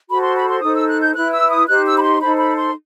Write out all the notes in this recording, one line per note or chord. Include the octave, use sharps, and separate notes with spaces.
F#4 A4 C5 B5
C6
B5
C6
D#4 A4 C5 D#6
E6
F#6
G6
E4 B4 F#6
E6
D#6
D#4 G4 C5 F#6
E6
B5
C6
D#4 A4 C5 B5
B5
C6